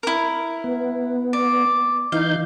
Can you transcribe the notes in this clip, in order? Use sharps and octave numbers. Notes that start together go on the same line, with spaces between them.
E4 A#4
B3
D5
E3 D#4 F5 G6